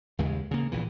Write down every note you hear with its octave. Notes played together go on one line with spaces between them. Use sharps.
D#2 C#3 G#3
C#3 A#3
A#1 A#2 E3